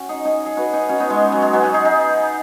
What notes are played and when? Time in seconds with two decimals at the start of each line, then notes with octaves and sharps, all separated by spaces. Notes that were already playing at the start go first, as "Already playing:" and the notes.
Already playing: C#4 F#4
0.09 D#4 G#4
0.25 D#4 G#4
0.46 G#4
0.57 F#4 B4
0.73 D#4 G#4
0.89 C#4 F#4
1.00 B3 D#4
1.10 G#3 C#4
1.32 F#3
1.42 G#3
1.53 F#3 B3
1.63 D#4 G#4
1.74 D#4 G#4
1.85 D#4 G#4